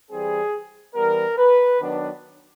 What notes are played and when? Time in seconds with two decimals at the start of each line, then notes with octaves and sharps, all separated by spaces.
0.11 E3 G3 C4 G#4
0.95 E3 G3 B3 A#4
1.38 B4
1.79 D#3 F#3 B3 D4